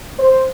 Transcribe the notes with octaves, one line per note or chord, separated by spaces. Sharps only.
C5